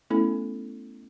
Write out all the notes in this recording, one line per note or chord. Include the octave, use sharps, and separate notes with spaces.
A3 B3 C#4 E4 A4